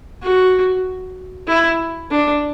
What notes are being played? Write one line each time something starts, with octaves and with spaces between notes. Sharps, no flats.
F#4
E4
D4